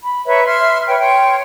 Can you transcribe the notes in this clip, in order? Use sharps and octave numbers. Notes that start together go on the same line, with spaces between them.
B5
B4 C#5 E5 A#5
E5 C6 F6
B4 C#5 G5
C#5 G5 C6